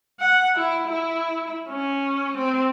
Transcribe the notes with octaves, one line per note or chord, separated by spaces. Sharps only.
F#5
E4
E4
C#4
C4